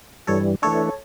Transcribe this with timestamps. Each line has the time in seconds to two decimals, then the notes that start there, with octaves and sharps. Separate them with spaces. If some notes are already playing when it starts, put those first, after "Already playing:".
0.27 G2 E3 G3 A4 C#5
0.62 E3 A3 D4 A4 C#5